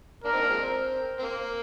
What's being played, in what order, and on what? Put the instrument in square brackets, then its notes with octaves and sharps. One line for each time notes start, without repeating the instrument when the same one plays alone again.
[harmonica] A#3 D4 [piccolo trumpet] A#4
[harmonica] C4 D#4
A#3 D4
F3 G#3 C4
C4
A#3